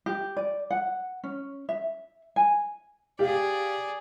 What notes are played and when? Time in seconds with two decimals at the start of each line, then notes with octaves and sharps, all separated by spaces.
0.06 G4
0.37 D5
0.71 F#5
1.24 C#4
1.69 E5
2.36 G#5
3.19 G4 G#4 D5 F5